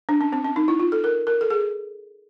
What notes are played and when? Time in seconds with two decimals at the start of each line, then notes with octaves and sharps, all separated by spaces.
0.09 D4
0.21 C#4
0.33 C4
0.45 C#4
0.56 D#4
0.68 E4
0.80 F4
0.92 A4
1.04 A#4
1.27 A#4
1.41 A4
1.50 G#4